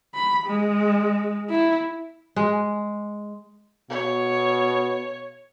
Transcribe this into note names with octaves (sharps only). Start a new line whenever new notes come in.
B5
G#3
E4
G#3
B2 C#5